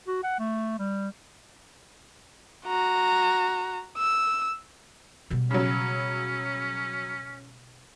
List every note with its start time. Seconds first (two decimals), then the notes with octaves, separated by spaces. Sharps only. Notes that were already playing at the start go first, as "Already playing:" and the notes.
0.07 F#4
0.23 F#5
0.39 A3
0.79 G3
2.66 F#4 A#5
3.98 E6
5.30 B2 G3
5.51 C#3 F#3 C#4